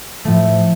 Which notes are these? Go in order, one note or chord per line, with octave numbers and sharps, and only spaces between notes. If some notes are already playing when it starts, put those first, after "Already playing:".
A2 F3 A3